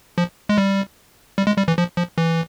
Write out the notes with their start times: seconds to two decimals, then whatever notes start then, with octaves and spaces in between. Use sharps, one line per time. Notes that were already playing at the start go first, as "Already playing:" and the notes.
0.18 F3
0.49 G#3
0.58 G3
1.38 G3
1.47 G#3
1.57 G3
1.68 E3
1.78 F3
1.97 F3
2.18 E3